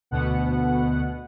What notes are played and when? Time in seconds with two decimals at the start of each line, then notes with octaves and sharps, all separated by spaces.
0.11 D2 B2 B3 F#5